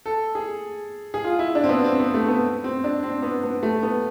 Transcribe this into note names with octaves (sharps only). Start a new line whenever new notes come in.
A4
G#4
G#4
F4
E4
D4
C4
B3
C4
B3
A3
B3
C4
D4
C4
B3
B3
A3
B3